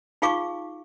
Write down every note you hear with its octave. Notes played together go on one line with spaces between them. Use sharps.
D#4 F4 G#4 F5 C#6 D6